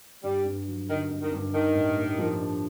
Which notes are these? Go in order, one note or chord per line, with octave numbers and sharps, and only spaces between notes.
G2 G3
G2
F#3
D3 D#3
G2
D#3
G2
D#3 D4
A2
A#3
F3
D4